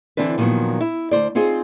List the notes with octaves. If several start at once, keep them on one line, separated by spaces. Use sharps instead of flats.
D3 E3 C4 D4 B4
A#2 D3 D#3 F3 F#3 B3
E4
D2 B2 C5 D5
C4 D#4 F4 G#4 C5